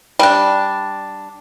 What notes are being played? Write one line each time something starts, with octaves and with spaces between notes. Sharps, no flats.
G3 D4